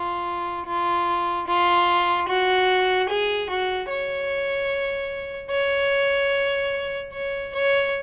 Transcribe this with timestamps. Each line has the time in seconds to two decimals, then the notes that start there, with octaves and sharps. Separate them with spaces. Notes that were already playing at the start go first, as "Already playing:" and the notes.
Already playing: F4
0.66 F4
1.47 F4
2.29 F#4
3.09 G#4
3.50 F#4
3.90 C#5
5.51 C#5
7.13 C#5
7.55 C#5